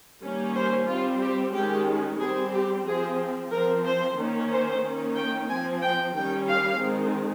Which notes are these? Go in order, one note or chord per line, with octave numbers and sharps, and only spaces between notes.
D#3 G3 A#3 C#4
C5
G3 C4 F4
G4
D#3 G#3 C#4 G4
G3 C4 G#4
G4
F3 C4 G#4
F3 C4 A#4
C5
D#3 A#3 C#4
C5
D#3 A#3 C#4
G5
F3 C4 G#5
G5
D#3 G3 C#4 G5
F5
D#3 G#3 C4